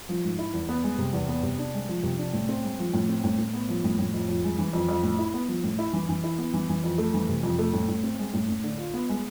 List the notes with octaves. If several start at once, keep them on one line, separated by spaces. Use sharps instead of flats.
F3
G#2
E4
E2
B3
G#3
C3
E2
B3
C3
D4
G#3
F3
C3
D4
A2
C4
G#3
F3
A2
C4
A2
A2
B3
F3
A2
A2
F2
F2
G#3
E3
F2
F2
A2
E4
B3
F3
A2
E4
E3
E3
E4
B3
E3
E3
F2
A3
E3
C3
F2
A3
A2
A2
C4
G#3
A2
A2
D3
F4
B3
G#3